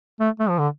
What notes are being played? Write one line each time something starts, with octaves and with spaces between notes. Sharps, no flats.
A3
A3
F3
D3